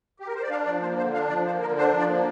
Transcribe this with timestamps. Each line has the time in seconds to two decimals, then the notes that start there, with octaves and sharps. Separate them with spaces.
0.20 G4
0.27 A#4
0.35 C5
0.42 D5
0.50 D4 F5
0.66 F3 D5
0.81 A#3 C5
0.97 D3 C5
1.13 D4 F5
1.29 F3 D5
1.45 A#3 C5
1.61 D3 A#4
1.76 D4 C5
1.93 F3
1.98 D5
2.08 A#3